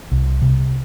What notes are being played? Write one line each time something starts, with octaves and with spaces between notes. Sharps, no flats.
C2
C3